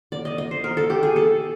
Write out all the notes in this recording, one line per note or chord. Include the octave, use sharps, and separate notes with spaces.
D5
D#5
D#5
C5
A#4
A4
G4
G#4
A4